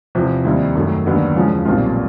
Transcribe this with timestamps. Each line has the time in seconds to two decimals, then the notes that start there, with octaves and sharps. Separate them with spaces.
0.15 E2 C3 F3
0.45 D#2 D#3 G3 C4 E4
0.75 F#2 D#3 F#3 A3
1.05 D#2 D3 F#3 B3 D4
1.35 E2 C#3 F3 G#3
1.65 B1 A#2 G3 C4 F4